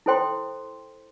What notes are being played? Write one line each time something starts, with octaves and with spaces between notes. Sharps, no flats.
E4 A4 C5 G5 C6